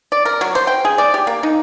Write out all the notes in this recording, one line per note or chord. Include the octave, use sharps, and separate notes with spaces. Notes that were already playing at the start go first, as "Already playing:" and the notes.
D5
A#4
F#3
C5
G5
G#4
D5
G4
A#3
D#4